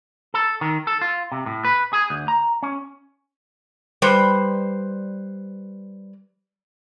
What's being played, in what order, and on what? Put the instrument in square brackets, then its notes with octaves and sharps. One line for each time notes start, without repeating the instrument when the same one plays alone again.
[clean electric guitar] A4
D#3
A4
F4
C3
A2
B4
G#4
D2
A#5
C#4
[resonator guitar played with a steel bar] G3 B4 C5